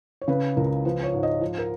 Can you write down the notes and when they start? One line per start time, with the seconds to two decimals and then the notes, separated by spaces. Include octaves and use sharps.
0.21 C#5
0.28 C#3 B4
0.57 C#2 A#4
0.85 F3 B4
1.03 C#5
1.13 G#2
1.23 D#5
1.41 F3
1.58 A#4